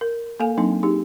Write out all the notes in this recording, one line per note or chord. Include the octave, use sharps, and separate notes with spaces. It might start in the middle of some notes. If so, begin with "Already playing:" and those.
A#4
A#3 A4 F5 G#5
F#3 A#3 C4 D4 D#4
D#4 G4 G#4